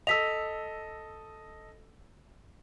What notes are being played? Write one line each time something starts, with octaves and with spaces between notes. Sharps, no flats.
A4 D#5 E6 B6 F7